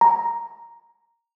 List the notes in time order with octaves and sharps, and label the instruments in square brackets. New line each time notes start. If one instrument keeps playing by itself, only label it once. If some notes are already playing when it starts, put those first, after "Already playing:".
[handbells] A#5